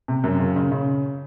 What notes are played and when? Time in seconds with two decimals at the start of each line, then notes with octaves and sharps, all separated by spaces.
0.08 C3
0.24 F#2
0.40 C#3
0.56 C#3
0.72 C#3